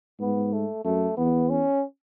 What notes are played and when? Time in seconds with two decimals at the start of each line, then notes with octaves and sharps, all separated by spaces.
0.20 G#2 B3
0.53 A3
0.85 F#2 A3
1.17 E2 B3
1.50 C#4